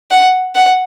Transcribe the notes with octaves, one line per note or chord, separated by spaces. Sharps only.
F#5
F#5